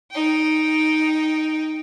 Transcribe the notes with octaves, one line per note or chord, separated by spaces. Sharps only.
D#4 G5